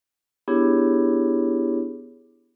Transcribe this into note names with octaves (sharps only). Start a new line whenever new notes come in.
B3 D4 E4 G4 G#4 C#5